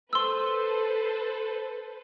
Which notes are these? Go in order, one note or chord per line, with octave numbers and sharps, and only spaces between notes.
A4 B4 C5 C6 E6